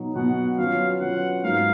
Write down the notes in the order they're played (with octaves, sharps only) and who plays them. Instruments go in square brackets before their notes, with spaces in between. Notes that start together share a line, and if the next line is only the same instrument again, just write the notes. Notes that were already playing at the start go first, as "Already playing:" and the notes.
Already playing: [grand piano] B2 F#3 B3 D#4
[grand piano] B2 F#3 B3 D#4 [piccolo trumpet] F#5
[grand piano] F#3 C#4 F4 B4 [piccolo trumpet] F5
[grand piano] F#3 C#4 F4 B4 [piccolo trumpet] F#5
[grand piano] G#2 F#3 A#3 D#4 [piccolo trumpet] F5